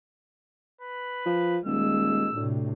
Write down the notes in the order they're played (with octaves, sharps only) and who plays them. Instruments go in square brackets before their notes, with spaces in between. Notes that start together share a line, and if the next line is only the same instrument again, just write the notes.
[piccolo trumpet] B4
[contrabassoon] F3
[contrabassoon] D#1 [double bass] G#3 [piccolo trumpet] E6
[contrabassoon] D2 [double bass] A2 C3